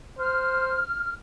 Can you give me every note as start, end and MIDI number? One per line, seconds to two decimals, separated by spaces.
0.18 0.81 72
0.18 1.11 89